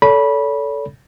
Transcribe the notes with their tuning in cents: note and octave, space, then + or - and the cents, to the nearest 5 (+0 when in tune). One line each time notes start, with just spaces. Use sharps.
A4 +0 C#5 +45 B5 -15